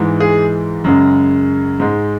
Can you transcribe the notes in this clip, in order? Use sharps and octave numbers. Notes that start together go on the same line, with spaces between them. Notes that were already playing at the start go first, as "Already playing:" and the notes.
Already playing: G#2 E3 G#3
G#4
F#2 C#3 G#3
G#2 G#3